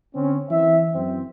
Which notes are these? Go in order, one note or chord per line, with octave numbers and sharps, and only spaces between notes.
D3 C4 C#4
E3 C4 E5
F#2 E3 C4